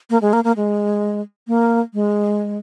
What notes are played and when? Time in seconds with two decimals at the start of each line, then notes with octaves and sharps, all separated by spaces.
0.10 A#3
0.22 G#3
0.33 A#3
0.44 A#3
0.56 G#3
1.48 A#3
1.94 G#3